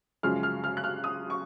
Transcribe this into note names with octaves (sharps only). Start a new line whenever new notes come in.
F#2 C#3 F3 G#3 F6
F6
F6
F#6
F6
D#6
C#6